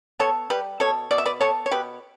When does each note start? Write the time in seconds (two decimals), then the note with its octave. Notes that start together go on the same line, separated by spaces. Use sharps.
0.19 B3 A4 C#5
0.50 G3 G4 B4
0.80 B2 A4 C#5
1.11 B2 D5
1.18 E5
1.26 B4 D5
1.41 B3 A4 C#5
1.66 C#5
1.71 B2 G4 B4